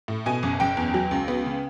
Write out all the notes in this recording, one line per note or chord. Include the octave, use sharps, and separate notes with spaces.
A2
B2 G#5
F#1
F#1 G5
E2
F#3
C#2
B3
C#3